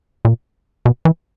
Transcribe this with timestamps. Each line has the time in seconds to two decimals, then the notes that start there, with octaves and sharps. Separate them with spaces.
0.25 A#2
0.85 B2
1.05 E3